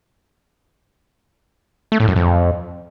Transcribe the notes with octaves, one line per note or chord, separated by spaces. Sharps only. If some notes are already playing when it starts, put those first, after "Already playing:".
A3
A2
F#2
F2